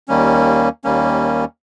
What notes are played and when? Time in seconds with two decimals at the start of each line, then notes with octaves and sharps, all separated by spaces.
0.08 D#2 D#3 G3 A#3 C#4
0.84 D#2 D#3 G3 A#3 C#4